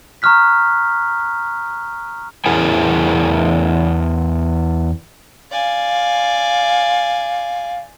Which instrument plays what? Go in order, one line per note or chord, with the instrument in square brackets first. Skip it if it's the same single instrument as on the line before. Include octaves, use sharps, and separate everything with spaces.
[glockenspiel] A#5 C#6 D#6 F6 F#6 B6
[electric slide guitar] E2 E4 G#4 A#4 G#5
[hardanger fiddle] D5 G#5 [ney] F5